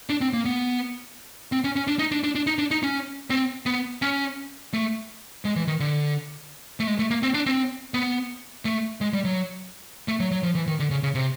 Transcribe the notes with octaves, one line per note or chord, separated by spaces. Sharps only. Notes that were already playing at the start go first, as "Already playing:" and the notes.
D4
C4
A#3
B3
C4
C#4
C#4
D4
D#4
D4
D4
D4
D#4
D4
D#4
C#4
C4
B3
C#4
A3
G#3
E3
D#3
D3
A3
G#3
A3
A#3
C4
D4
C4
B3
A3
G#3
G3
F#3
A3
F#3
F#3
F3
E3
D#3
D3
C#3
C#3
C3